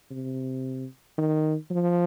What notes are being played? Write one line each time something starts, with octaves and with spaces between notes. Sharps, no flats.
C3
D#3
F3